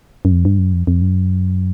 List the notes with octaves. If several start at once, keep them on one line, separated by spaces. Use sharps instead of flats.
F#2
F2
G2
F#2
F2
F2
F#2